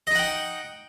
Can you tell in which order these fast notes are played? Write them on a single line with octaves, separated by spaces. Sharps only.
D#5 D#4 F#5 G5